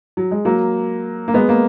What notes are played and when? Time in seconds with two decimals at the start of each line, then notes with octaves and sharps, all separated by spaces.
0.17 F#3
0.31 G#3
0.45 F#3 A#3
1.28 A#3
1.34 G#3 B3
1.49 A#3